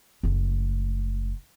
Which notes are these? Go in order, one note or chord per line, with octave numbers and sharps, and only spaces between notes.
F#1 A3